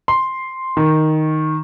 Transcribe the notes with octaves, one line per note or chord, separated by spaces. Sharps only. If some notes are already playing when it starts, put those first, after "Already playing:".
C6
D#3